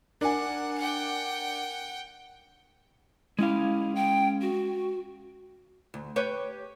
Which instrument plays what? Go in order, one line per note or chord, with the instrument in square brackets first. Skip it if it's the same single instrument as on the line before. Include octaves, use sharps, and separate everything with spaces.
[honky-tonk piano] D4 [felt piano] A#4 G#5 [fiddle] F#5
[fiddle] F#5 G5
[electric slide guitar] G#3 C#4 F5 [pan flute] E4
[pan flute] G5
F#4
[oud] D2
G4 B4 C#5